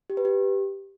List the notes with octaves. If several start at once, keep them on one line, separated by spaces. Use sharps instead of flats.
G4
B4
G4